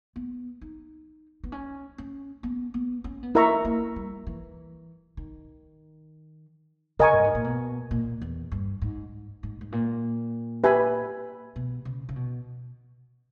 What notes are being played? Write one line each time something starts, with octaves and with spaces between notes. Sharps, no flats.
B3
D#4
B3
C#4
C#4
B3
B3
C#4
B3
A#3 E4 A#4 E5 A#5 C#6
A#3
G3
E3
D#3
C#3 A#4 D#5 G#5 C#6
G2
G#2
A#2
B2
A#2
E2
G2
G#2
G#2
G#2
A#2
G4 B4 E5 G#5 B5
B2
C#3
C#3
B2